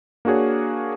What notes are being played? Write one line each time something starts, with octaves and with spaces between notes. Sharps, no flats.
A#3 D4 F#4 G#4 C#5